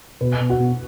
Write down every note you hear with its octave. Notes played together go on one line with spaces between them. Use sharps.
B2 B4
B2
F#4
B2